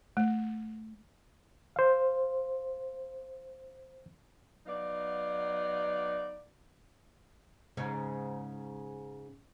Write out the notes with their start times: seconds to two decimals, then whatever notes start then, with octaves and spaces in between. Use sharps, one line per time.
0.17 A3
1.76 C5 F5
4.67 F#3 B3 D#4 D5 F5
7.77 G#2 C#3 C#4